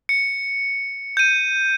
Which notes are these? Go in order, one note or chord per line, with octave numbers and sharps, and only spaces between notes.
C#7
G6 D#7